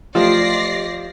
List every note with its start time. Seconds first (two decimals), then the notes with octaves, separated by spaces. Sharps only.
0.15 F3 A3 F4 G4 D5 D#5 A#6 C7